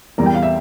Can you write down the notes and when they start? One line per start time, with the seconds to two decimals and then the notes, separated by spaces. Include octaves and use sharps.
0.18 E2 E3 G3 A#4
0.26 G5
0.34 F5
0.42 E5